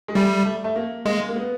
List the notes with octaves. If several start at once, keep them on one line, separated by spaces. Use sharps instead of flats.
G#3
G3 A3
A3
A3
A#3
G#3 A#3
A#3
B3